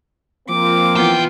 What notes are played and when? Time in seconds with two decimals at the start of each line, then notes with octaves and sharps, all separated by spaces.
0.48 F3 A#3 C4 D6
0.95 C2 E3 B3 F4 G5